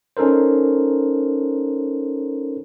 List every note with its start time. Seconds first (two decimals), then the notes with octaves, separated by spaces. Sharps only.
0.17 C#4 D#4 A4 A#4 C5